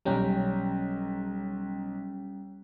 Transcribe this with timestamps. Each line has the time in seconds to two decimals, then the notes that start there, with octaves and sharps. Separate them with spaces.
0.05 B1 G3 C#4 G5 A#5